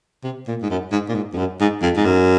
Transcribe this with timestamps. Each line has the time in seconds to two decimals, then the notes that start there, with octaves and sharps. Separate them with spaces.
0.24 C3
0.48 A#2
0.63 G#2
0.70 F#2
0.92 G#2
1.09 A#2
1.15 G#2
1.33 F2
1.38 F#2
1.60 G#2
1.82 F2
1.96 G#2
2.05 F#2